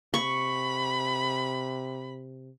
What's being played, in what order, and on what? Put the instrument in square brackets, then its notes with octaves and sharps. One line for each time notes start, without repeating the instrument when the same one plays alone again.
[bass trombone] C3 [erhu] B5 [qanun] C#6